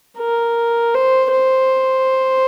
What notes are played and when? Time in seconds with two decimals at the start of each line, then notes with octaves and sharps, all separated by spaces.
0.19 A#4
0.95 C5
1.32 C5